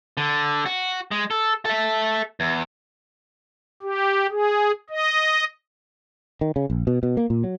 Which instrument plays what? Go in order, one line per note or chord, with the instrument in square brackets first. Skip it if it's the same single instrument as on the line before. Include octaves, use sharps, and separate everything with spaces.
[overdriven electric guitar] D3
F#4
G#3
A4
A4 E5
E2
[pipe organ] G4
G#4
D#5
[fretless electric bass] D#3
C#3
A#1
B2
B2
A#3
A#2
F#3